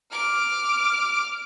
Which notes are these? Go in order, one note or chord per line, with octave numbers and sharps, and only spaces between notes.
D6 F6